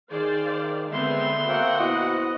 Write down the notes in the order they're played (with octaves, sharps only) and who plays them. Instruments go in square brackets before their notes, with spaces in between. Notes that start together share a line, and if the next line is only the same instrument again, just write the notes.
[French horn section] D#3 [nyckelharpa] G#4 [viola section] C5 D5 F5
[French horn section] D3 [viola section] G#3 B3 C4 [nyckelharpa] E5 C6
[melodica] A#3 C4 G5 [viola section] F#4 F#5
[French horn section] A#2 E4 C5 [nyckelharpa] B3 [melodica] D#5